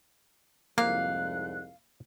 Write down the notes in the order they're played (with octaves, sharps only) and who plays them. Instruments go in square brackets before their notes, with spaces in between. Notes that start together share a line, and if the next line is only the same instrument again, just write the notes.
[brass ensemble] C2 F2 G#2 [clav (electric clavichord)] A#3 [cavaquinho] F5 [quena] F#6